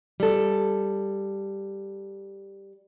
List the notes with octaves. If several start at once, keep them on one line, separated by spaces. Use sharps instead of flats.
G3 A4